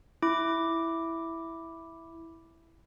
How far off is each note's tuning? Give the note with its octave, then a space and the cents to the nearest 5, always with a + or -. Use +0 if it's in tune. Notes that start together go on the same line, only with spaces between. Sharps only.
E4 +0 D6 +0